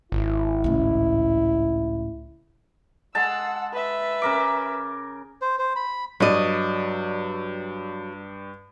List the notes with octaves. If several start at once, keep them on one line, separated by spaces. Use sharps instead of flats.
G#1 E4
C#2 A2
G#3 F#5 A5 E6
B4 E5
C#3 A#4 D6
C5
C5
B5
G2 F#3 D5 D#5